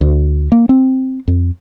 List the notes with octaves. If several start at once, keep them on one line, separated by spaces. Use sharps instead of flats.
D2
A#3
C4
F2